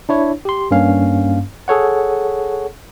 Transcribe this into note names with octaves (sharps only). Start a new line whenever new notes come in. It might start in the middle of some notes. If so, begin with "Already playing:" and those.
D4 E4 C#5
G4 C6
G2 A#3 C#4 F5
G#4 A4 C#5 F#5